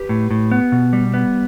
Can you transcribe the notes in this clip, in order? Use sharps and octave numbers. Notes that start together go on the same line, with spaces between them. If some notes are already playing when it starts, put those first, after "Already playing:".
Already playing: G4 B4
A2
A2
B3
B2
G3
B3